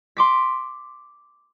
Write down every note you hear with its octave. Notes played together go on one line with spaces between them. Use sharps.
C6 D6 B6